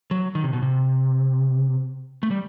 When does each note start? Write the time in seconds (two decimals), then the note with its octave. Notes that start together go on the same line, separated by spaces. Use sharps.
0.11 F#3
0.35 D#3
0.44 C3
0.53 B2
0.62 C3
2.23 A3
2.31 G3